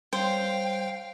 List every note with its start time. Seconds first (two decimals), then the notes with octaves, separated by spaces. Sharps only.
0.13 G3 C5 C#5 F5 G5